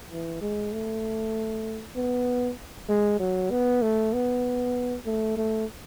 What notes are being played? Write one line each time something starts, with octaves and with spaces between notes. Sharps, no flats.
E3
G#3
A3
B3
G#3
F#3
B3
A3
B3
A3
A3